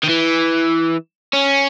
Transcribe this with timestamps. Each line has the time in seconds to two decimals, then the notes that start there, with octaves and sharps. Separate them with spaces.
0.04 D#3
0.09 E3
1.34 C#4